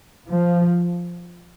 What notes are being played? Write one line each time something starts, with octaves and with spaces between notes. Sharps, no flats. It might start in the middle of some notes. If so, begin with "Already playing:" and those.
F3